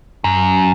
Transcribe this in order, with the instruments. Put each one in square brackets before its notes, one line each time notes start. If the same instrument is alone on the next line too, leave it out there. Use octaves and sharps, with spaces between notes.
[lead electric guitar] F#2